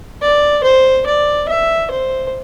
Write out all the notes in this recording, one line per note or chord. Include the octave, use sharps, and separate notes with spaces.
D5
C5
D5
E5
C5